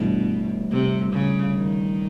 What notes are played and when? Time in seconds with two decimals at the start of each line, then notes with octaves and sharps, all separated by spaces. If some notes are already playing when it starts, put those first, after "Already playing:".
Already playing: G1 G2 B2 E3 A3 D4
0.71 C3
1.13 C#3
1.56 D#3